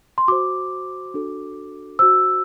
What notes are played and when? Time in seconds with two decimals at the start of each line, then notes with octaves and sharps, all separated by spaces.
0.18 C6
0.28 F#4 C5 D6
1.14 D4 F#4 A4
1.99 F#4 C5 E6